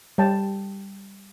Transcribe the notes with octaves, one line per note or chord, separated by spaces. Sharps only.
G3 G5 A5